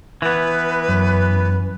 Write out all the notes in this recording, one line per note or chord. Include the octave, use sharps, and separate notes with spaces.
E3 B3 B4
F#2